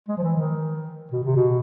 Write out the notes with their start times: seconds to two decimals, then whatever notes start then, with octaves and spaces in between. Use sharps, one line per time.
0.08 G#3
0.18 F3
0.23 E3
0.37 D#3
1.12 B2
1.24 C3
1.36 B2